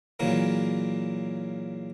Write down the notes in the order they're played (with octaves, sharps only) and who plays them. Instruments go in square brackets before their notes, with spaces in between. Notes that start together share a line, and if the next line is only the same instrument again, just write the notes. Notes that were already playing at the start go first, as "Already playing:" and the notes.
[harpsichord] A#2 C#3 E3 F#3 A#3